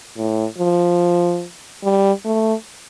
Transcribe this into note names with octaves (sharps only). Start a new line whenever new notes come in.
A2
F3
G3
A3